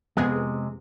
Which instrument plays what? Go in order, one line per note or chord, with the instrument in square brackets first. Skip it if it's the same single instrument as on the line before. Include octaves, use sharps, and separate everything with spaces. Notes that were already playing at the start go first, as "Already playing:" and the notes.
[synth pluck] F2 B3 G#4 [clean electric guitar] C3 G#3